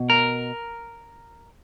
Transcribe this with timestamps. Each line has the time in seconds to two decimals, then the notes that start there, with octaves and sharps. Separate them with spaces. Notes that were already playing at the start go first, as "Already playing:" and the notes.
Already playing: B2
0.10 A#4